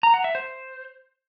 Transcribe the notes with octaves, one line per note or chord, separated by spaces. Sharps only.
A#5
F#5
E5
C5